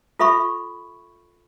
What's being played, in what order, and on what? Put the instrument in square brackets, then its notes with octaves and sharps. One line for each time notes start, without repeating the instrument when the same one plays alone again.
[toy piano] F4 A4 E5 B5 C#6